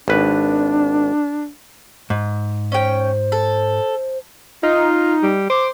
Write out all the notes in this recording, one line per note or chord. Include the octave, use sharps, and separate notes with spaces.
G#1 D4 B4
G#2
C#4 C5 G5
A4
D#4 F4
G3
C5 D6